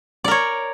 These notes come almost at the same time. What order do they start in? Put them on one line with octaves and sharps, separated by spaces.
D5 A#4 C#5